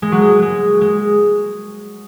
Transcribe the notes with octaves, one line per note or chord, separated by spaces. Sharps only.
G#3
F#3
G#3
G#3
G#3